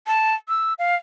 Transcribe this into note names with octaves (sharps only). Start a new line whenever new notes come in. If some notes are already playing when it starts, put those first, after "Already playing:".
A5
E6
F5